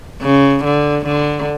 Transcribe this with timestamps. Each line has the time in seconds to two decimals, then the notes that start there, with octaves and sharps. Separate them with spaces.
0.22 C#3
0.65 D3
1.06 D3